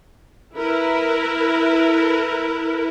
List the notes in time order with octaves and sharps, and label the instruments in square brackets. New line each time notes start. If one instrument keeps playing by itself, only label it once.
[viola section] E4 A#4 B4